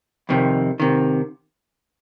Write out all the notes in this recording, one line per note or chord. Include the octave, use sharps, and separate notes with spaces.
F2 C3 D#3
C3 D#3